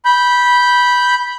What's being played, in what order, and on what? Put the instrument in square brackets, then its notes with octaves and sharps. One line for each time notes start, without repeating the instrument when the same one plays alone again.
[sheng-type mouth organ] B5 G6